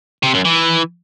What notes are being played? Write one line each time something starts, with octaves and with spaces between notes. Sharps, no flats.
C3
F#2
E3